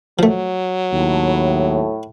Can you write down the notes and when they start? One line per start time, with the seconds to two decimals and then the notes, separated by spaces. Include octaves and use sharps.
0.19 F3 F#3 A3
0.93 D#2 A2